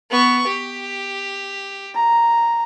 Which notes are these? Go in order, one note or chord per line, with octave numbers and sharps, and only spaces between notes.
B3 C#6
G4
A#5